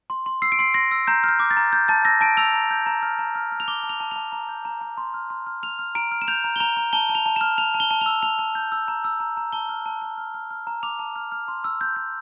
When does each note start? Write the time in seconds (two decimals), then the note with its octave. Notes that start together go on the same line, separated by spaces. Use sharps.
0.10 C6
0.26 C6
0.42 E6 C7
0.52 D7
0.59 C6 C7
0.74 C6 A#6
0.91 E6
1.07 A#5 G6
1.24 F6 G6
1.40 D6
1.51 A6
1.57 A#5
1.73 G6
1.88 A5 A6
2.05 E6 A#6
2.21 A5 D7
2.37 E6 F7
2.54 A#5
2.71 G6
2.86 A#5
3.03 F6
3.19 A#5
3.35 F6
3.52 F6
3.60 F7
3.68 D6 G7
3.83 A5
3.89 F7
4.00 A5
4.11 A5 F7
4.32 A#5
4.49 G6
4.65 A#5
4.81 A#5
4.97 C6
5.14 F6
5.30 C6
5.47 F6
5.63 F6 F7
5.79 F6
5.95 A#5 D7
6.12 F6
6.22 E7
6.28 G6 F7
6.44 A#5
6.56 G7
6.60 A#5 F7
6.77 A#5
6.93 A5 G7
7.09 A5
7.15 F7
7.26 A5
7.36 F6 E7
7.58 A5 F7
7.74 A5
7.80 G7
7.91 A5
8.01 E6 F7
8.23 A5 F7
8.39 A5
8.55 G6
8.72 E6
8.88 A#5
9.04 E6
9.20 A#5
9.37 A#5
9.52 A5 G7
9.69 F6
9.86 A5
10.02 A5
10.18 F6
10.34 F6
10.51 F6
10.67 A#5
10.83 D6 F7
10.99 A5
11.16 F6
11.32 F6
11.48 C6
11.64 E6
11.81 G6
11.96 G6